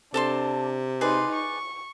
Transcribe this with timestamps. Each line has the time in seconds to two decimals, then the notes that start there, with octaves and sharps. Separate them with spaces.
0.14 C3 D4 A4 A5 C6
1.01 D#4 G#4 B4 D5 C6
1.34 C#6